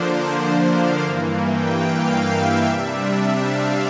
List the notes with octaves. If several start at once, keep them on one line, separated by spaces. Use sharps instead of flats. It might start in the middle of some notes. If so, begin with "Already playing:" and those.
Already playing: D3 F3 A#3 D4 C5
F5
G2 E3 A#3
G5
F5
E5
C3 G3 D4 E5
F5